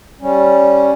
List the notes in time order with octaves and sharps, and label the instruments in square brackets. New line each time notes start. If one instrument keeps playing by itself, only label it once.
[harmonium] G3 C#4